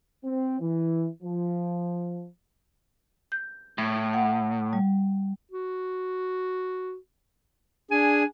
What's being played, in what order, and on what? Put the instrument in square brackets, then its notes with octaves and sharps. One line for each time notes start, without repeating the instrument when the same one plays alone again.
[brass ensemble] C4
E3
F3
[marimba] G6
[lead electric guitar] A2
[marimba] F#5
G3
[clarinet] F#4
[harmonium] D4 G#4 [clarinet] G#5